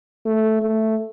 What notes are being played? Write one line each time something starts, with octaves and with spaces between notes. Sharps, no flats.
A3
A3